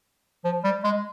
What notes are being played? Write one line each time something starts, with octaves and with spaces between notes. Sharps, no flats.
F3
G3
G#3